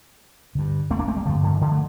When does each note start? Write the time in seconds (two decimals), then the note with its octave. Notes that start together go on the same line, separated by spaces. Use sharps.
0.55 G2 D3
0.91 A3 C4
0.99 A#3 D4
1.08 A3 C4
1.17 G3 A#3
1.25 G2 D3 F3 A3
1.43 D3 F3
1.52 E3
1.61 D3 F3
1.72 A3